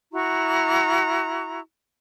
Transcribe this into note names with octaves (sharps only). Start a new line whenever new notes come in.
E4 F#4 A#5 C#6